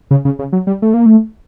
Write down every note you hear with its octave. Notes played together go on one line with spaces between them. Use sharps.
C#3
C#3
C#3
F#3
G3
A3
A#3
A3